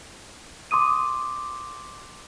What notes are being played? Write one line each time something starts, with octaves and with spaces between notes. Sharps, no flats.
C6 D6 D#6 D#7